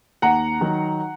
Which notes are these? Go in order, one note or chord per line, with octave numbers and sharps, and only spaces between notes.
D#2 F#5 A#5
D#3 F#3